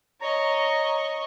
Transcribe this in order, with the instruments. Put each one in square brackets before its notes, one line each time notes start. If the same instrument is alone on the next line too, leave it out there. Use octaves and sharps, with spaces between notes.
[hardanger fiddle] C#5 D#5 [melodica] A#5